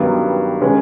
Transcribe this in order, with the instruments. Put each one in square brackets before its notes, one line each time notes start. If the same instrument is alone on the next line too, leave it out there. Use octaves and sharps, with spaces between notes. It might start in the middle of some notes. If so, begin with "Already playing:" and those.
Already playing: [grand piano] G2 D#3 F#3 B3
D#3 G#3 C#4